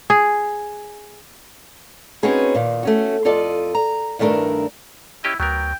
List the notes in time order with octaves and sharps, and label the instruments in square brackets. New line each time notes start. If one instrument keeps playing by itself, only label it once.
[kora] G#4
[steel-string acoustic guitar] C4 C#4 D#4 F#4 G#4 B4
A#2 D#3
A3 C#4 F#4
F2 F4 A4 D5 D#5
A#5
G2 D#3 A3 D4 A#4
[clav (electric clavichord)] C#4 G4 D#5 [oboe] E4
[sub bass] D2 [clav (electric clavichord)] F#3 B3 A#4 [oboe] G5